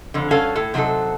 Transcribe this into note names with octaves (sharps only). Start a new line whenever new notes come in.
F2 D3
G2 C#4 F#4 A4 F5 G#5
A2 A4
C3 F#3 C4 D#4 A4